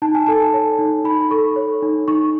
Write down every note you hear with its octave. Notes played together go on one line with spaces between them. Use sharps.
D#4 A5
G#5
A4 A5
C#5
D#4
D#4 B5
B5
A4 C#6
C#5
D#4
D#4 C#6